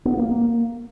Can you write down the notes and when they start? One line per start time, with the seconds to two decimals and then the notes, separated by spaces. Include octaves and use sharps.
0.05 B3
0.17 A#3
0.29 A#3